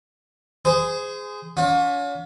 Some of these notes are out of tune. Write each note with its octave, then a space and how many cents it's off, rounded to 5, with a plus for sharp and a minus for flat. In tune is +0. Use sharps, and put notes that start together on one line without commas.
G#4 +0 C5 -30
C#4 +40 F4 +45